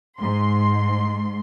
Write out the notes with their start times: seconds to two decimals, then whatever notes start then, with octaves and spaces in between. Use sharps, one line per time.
0.19 G#2 C6